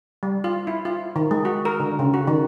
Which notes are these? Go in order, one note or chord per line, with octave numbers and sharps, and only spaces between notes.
G3
F4
E4
F4
D#3
G#3
F#4
A#4
D3
C#3
F#4
D#3